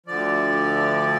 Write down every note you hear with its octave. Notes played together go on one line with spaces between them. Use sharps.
D2 D3 F3 D5